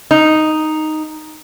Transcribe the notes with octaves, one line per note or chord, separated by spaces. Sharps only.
D#4